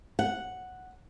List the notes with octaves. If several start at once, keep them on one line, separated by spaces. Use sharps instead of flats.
F#5